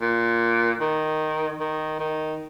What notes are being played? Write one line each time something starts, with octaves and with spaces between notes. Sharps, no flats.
A#2
D#3
D#3
D#3